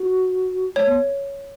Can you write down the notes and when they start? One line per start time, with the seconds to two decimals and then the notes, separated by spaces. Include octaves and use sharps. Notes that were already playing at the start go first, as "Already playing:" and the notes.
Already playing: F#4
0.75 A3 C#5
0.86 B3